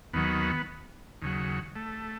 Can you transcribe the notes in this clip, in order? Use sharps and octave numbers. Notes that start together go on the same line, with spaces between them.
D#2 D#3 F#3 B3
D#2 C#3 F#3
A3